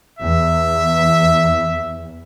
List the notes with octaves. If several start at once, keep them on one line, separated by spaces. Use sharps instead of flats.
E2 E5